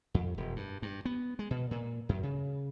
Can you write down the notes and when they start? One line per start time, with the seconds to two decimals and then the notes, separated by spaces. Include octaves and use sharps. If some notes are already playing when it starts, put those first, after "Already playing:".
0.14 F2
0.38 E1
0.56 G2
0.82 G2
1.05 B3
1.39 G#3
1.51 B2
1.71 A#2
2.09 F#2
2.23 C#3